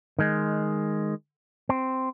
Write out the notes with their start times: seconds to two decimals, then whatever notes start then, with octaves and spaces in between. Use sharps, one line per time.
0.19 D#3 G#3
1.69 C4